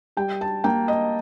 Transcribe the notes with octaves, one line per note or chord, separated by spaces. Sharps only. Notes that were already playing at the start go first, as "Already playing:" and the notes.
G3 G5
A5
A#3 G5
D#5